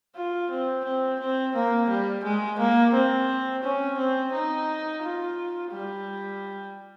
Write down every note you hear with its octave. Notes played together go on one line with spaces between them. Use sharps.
F4
C4
C4
C4
A#3
G3
G#3
A#3
C4
C#4
C4
D#4
F4
G3